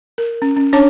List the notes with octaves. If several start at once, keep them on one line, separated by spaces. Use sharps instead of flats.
A#4
C#4
C#4
C#4 D4 C#5 A5 D6